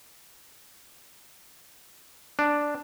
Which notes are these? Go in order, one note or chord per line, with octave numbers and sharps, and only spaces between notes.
D4